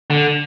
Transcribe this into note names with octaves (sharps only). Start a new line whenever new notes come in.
D3